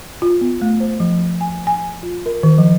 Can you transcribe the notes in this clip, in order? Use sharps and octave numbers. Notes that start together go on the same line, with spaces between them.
F4
B3
A3
C5
F3
G#5
G#5
F4
A#4
D#3
F3